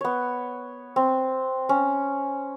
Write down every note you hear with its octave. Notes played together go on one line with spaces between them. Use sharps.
B3 C#5
C4
C#4